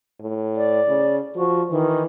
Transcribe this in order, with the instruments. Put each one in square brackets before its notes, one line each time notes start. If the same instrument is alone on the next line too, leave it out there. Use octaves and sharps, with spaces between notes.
[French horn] A2
[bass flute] D5
[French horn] C#3
[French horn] F3 [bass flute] F#4
[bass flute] D#3 [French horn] E3